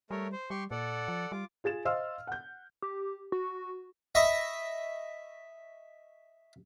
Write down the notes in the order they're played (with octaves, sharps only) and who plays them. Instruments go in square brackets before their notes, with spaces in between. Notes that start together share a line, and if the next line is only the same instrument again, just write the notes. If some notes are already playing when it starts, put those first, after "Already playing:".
[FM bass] G3 [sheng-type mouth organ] A3 A#4 C#5
[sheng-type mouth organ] C5
[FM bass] G3 [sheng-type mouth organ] G4 C6 C#6
[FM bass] A#2 [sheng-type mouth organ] A4 D5 F#5
[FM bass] F3
[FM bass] G3 [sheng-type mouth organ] F4 D6
[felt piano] F4 G#4 A6 E7
C5 D#5 F5 C6 E6 F6
F#5 G6
[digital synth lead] G4
F#4
[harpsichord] D#5 E5 B5 C#6